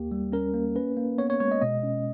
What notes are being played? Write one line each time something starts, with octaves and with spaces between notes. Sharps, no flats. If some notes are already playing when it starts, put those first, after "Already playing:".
Already playing: D#2 A#3 G4
G3
C#4 A#4
A#3
C#4 B4
A#3
B3 C#5
C#5
G#3 C#5
D#5
B2 D#5
C#4